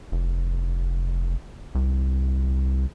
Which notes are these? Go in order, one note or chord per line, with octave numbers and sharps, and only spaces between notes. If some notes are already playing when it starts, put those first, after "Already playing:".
F1
C2